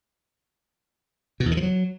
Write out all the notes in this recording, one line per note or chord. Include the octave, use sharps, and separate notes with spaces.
B2
E2
D#3
F3
F#3